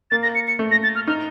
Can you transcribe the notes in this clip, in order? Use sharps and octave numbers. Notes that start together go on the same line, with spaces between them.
A#3 A6
A#6
C#7
C#7
A3
A#6
A6
F6
D#4 F6